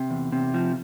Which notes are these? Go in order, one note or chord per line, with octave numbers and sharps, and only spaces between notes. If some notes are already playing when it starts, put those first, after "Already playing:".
Already playing: C3
E2
C3
F3